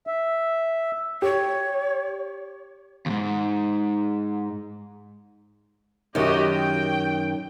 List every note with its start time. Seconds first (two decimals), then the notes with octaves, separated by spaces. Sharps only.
0.07 E5
1.22 G4 C#5
3.06 D#2 G#2
6.15 F#2 D#3 F#4 G4 D#5
6.51 G5